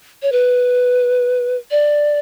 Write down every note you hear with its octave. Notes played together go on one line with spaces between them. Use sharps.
C#5
B4
D5